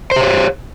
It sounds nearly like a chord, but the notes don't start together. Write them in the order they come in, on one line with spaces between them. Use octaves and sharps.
C5 G4 C#5